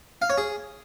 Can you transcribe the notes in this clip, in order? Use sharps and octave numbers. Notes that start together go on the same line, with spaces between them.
F5
C#5
G#4